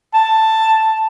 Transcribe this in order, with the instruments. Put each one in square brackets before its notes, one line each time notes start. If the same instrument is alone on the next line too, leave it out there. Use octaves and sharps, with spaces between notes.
[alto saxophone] A5